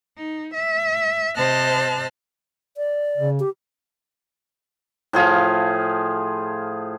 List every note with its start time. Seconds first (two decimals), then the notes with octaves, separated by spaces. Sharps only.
0.17 D#4
0.53 E5
1.35 C3 C5 D#5 A5 F6 F#6
2.77 D5
3.17 C#3
3.40 G4
5.13 A2 F3 G#4 F5